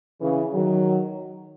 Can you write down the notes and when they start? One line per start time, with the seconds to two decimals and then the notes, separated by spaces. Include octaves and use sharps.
0.21 C#3 E3
0.53 D#3 F#3